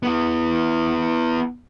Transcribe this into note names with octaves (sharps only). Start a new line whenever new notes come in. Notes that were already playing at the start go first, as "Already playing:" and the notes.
B3 E4